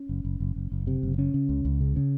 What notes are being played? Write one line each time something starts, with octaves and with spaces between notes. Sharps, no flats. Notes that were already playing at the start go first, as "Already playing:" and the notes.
Already playing: C#4
F#1
F#1
F#1
F#1
F#1
C3
F#1
C#3 C#4
C#3
C#2
C#2
C#3
C#3